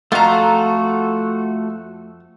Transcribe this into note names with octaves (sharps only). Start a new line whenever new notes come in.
F2 A3 F4 F#4 A4 A#5